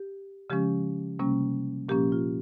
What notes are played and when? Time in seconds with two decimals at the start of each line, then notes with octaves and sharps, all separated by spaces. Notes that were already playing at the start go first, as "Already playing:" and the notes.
Already playing: G4
0.50 C#3 F3 G#3 C#4 G4
1.19 C3 G3 A#3 C#4
1.89 A#2 F3 A#3 C#4 G4
2.12 F4